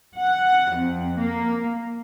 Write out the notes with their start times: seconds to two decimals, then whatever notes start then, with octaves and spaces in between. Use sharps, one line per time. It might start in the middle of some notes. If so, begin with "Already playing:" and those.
0.18 F#5
0.76 F2
1.20 A#3